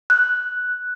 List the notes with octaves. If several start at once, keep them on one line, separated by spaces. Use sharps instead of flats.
F#6